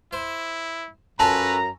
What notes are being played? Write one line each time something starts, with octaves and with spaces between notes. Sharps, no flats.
E4 C5
F#2 C#4 F4 A4 B4 A5 A#5